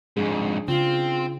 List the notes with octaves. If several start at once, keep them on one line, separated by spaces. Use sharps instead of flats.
F2 G#2 D4 G#4
C#3 C4 F4